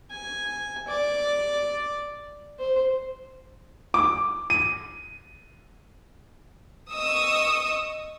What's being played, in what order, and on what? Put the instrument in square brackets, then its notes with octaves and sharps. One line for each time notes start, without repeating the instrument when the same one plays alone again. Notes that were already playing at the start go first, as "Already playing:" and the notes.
[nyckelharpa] G#5
D5
C5
[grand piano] D6
D#7
[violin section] D#5 C#6 D#6 E6